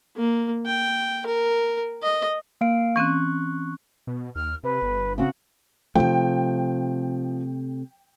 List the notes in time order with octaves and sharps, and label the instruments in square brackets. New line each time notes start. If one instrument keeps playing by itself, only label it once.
[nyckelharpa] A#3
G5
A#4
D#5
[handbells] A#3 F5 D7
[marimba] E3 C4 C#4 [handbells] C#6 F#6
[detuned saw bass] B2
[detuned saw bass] D#2 [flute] F6
[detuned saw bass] C3 [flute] B4
[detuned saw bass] G1
[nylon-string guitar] C#3 C4 [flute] F#4
[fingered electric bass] C3 A3 [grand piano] F3 [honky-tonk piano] G5